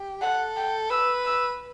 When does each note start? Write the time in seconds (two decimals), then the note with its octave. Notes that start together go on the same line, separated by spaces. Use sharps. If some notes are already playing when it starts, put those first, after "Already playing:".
Already playing: G4
0.22 A4 F#5
0.57 G5
0.90 B4 E6
1.25 E6